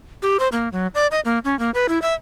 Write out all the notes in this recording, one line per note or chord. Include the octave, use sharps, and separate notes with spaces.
G4
C5
A#3
F#3
D5
D#5
A#3
C#4
A#3
B4
E4
E5